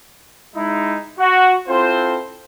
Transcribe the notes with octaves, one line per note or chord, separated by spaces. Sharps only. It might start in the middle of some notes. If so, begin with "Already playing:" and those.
G#3 D#4 E4
F#4
C4 E4 F4 A4 C5